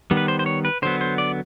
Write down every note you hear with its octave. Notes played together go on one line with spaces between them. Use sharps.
D#3 G3 B3
B4
C5
C5
C#5
B4
D3 F#3 B3 C5
C5
D5